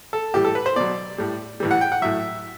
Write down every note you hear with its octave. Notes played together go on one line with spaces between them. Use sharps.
A4
A2 E3 G3 G4
A4
B4
C5
B2 F#3 D5
A2 G3
A2 E3 G3
F#5
G5
F#5
A2 F#3 E5